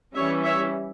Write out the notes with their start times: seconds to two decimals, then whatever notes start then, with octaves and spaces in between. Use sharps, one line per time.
0.15 E3 G3 C#4 C#5 E5
0.45 C#5 E5